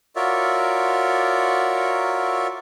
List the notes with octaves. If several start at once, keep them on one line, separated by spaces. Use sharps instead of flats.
F4 F#4 A#4 C#5 D5 E5